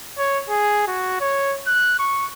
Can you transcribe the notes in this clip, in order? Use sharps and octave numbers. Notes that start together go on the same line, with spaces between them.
C#5
G#4
F#4
C#5
F#6
C#6